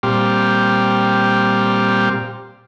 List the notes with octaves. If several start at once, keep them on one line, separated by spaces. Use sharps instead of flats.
A#2 G3 C4 G4 F6